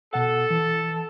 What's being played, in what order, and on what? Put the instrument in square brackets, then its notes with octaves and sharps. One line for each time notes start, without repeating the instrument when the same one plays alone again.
[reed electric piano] B2 F#5 [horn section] A4
[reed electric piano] E3